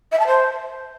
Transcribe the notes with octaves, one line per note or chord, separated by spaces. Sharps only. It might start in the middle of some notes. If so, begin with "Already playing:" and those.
E5
A5
C5